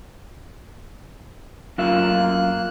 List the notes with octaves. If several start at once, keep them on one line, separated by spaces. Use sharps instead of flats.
F#2 A#3 F4 E5 F#6